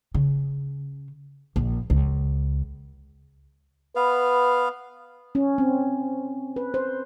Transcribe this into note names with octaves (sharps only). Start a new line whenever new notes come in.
C#3
A#1
C#2
B3 B4 F5
C#4
C4
B4
C5